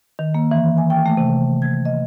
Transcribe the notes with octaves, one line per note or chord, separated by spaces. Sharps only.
D#3
A#3
E3
G#5
G5
A3
C3
G#6
D#5